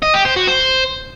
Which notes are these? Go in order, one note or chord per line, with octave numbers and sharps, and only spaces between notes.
D#5
G4
C5
F#4
C5